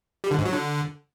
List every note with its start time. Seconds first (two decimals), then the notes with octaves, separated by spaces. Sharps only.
0.24 G3
0.31 D3
0.38 G#2
0.45 F#3
0.53 D3